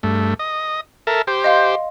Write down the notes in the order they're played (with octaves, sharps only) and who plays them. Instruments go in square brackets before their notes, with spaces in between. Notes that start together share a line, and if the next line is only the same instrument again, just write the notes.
[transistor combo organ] G2 A3
D#5
A4 A#4 E5
G4 C5
[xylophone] D#5 F5 C6